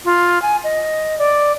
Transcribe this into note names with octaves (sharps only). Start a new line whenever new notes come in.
F4
G#5
D#5
D5